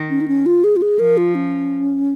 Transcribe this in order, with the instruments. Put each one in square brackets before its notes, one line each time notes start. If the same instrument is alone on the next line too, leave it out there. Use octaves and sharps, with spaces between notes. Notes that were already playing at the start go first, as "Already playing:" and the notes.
Already playing: [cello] D#3
[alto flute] C#4
D#4
C#4
F4
G#4
F4
G#4
[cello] F3 [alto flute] A#4
[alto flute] F4
C#4